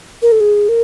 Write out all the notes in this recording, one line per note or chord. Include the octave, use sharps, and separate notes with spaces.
A#4
A4
G#4
A#4